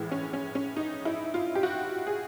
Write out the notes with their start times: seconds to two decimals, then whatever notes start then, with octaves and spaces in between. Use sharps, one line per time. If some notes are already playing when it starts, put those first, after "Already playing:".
Already playing: A#1 A2 E3 G#3
0.11 C#4
0.33 C#4
0.55 C#4
0.76 D#4
1.05 E4
1.34 F4
1.55 G4
1.63 F#4
2.07 G#4